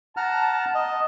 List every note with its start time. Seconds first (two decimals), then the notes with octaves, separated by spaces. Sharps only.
0.17 F#5 A5 A#5 F6
0.74 D#5